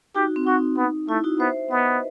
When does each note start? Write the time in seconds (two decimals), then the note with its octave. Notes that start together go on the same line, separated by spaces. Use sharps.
0.15 D#4 F#4 G4
0.36 C4
0.47 D#4 F#4
0.77 B3
1.09 A3 E4
1.24 D#4 F#4
1.40 B3 C5 E5
1.71 B3 B4 D#5